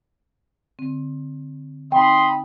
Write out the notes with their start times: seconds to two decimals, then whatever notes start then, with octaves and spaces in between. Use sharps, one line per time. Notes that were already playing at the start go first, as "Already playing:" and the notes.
0.79 D3 C4
1.92 C4 D#4 D#5 G5 B5 C6